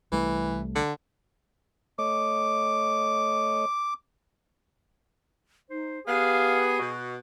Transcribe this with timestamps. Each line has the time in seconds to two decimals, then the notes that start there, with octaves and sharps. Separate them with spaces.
0.12 C2 E3 G3 A3
0.75 D3
1.99 A3 C#5 D#5 D6
5.70 D#4 C5
6.07 B3 G4 G#4 F5
6.79 B2 F#4